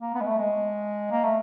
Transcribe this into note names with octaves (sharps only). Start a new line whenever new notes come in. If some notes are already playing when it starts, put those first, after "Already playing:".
A#3
B3
G#3
A3
G#3
A#3
A3